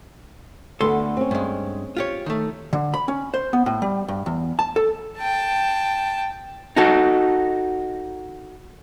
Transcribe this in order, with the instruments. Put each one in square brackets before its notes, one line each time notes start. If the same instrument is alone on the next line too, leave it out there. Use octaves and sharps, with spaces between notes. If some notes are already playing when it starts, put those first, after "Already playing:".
[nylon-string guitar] D2 D3 B3 [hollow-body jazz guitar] A4 C6
[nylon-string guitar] C4 C#4
[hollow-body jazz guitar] G2 G#3
F4 G4 C#5
D#3 A3
D3
B5
C#4
C5
B3
A2
G3
G2
E2
A5
A4
[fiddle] G5 A5
[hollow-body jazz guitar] D#4 F#4 A4